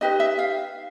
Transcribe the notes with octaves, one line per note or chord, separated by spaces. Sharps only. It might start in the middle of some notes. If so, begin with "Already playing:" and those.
D#4 G4 B4 D#5
E5
F5